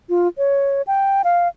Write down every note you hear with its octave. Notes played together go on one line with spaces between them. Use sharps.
F4
C#5
G5
F5